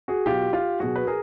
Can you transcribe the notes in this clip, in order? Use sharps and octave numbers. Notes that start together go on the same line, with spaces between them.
F#4 G#4
B2 F#3 F4 G4
F4 G4
B2 F#3 F#4 G#4
B4
G#4 A#4